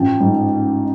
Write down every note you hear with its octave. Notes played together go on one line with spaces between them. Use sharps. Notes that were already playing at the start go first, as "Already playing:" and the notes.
Already playing: A1 F3 G5 A5
G#2